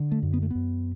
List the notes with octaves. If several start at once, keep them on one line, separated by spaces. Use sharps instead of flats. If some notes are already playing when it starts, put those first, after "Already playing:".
Already playing: D3
A3
F#2
B3
A3
F#2 B3